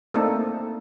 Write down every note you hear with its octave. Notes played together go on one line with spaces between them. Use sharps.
A3 A#3 C4 D4 D#4 A4